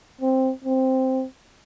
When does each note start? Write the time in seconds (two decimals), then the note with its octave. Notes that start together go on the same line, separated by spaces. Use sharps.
0.21 C4
0.64 C4